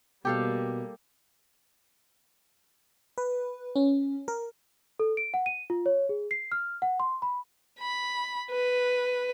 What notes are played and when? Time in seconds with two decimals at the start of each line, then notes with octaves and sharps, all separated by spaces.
0.25 B2 G3 A#3 G4 A4 F5
3.18 B4
3.76 C#4
4.28 A#4
5.00 A4
5.17 D7
5.34 F#5
5.46 D#7
5.70 F4
5.86 C#5
6.09 G#4
6.31 C7
6.52 F6
6.82 F#5
7.00 C6
7.22 B5
7.80 B5
8.51 B4